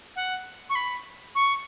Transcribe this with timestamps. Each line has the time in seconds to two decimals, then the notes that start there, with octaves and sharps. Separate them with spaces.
0.16 F#5
0.69 C#6
0.75 B5
1.35 C#6